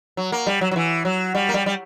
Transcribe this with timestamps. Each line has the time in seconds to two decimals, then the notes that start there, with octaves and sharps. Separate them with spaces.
0.17 F#3
0.32 A#3
0.47 G3
0.61 F#3
0.71 F#3
0.76 E3
1.05 F#3
1.35 G3
1.49 A#3
1.54 G3
1.66 G3